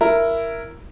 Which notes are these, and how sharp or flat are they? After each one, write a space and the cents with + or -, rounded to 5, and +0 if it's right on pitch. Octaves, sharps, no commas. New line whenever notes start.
E4 +10 A#4 +0